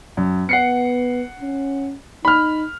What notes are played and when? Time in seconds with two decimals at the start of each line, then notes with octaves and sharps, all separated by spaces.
0.17 F#2
0.49 B3 F#5 C7 C#7
1.41 C#4
2.25 D#4 B5 F6